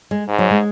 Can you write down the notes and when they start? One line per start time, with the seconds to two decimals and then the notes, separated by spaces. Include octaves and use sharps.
0.11 G#3
0.28 G#2
0.39 F#3
0.51 G#3